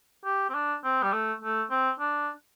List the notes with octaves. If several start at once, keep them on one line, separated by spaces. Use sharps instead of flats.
G4
C4
D4
C4
G3
A3
A3
C4
D4